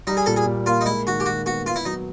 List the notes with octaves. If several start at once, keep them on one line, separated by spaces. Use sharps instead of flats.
G3 D#4
G#4
A#2 A4
G#4
A#2
A#3 F4
D#4
G#3 E4
D#3 F#4
G4
D#3 F#4
B3 F#4
B3 F4
E4
F#3 D#4